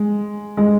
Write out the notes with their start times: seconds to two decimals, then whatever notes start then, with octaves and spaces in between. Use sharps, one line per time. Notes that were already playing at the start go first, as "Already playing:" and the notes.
Already playing: G#3
0.57 G#3